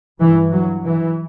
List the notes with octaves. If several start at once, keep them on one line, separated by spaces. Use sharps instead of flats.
G2 E3
F#3
E3